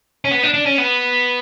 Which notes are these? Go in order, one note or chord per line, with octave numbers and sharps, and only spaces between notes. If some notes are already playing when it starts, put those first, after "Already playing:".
C#4
B3
D4
D4
C#4
B3